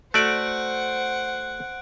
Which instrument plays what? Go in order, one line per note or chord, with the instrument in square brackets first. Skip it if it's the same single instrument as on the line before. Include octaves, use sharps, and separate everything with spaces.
[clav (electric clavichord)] A3 F#4 D5 [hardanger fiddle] C5 F#5 [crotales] F#6 D7